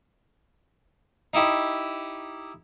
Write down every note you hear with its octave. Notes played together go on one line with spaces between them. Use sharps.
D#4 E4 G4 D#5